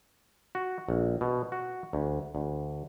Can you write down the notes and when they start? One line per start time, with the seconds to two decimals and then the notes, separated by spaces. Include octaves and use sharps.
0.55 F#4
0.89 A#1
1.21 B2
1.52 F#4
1.93 D2
2.35 D2